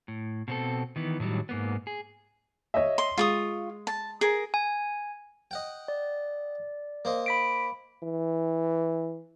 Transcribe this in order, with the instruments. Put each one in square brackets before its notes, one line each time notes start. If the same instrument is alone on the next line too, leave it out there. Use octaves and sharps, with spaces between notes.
[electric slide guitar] A2
B2 C4 A4
D#3 E3 B3
A2 D#3 F#3 G3
G#2 A#3 B3
G#4
[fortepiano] C#5 D#5 E5
[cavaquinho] C6
[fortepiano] G#3 [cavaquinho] F4 C#6 D#6
[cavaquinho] A5
G#4 A#4
[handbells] G#5
[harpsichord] D#5 F#5 G5
[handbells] D5
[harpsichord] A#3 C5 D#5
[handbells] B5 B6 D7
[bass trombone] E3